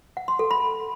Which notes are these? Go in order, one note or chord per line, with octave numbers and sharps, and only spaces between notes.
F#5
C6
A4
B5